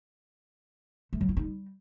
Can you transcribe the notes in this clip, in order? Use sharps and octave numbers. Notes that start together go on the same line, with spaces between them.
A3
F#3
E4
D#4
G3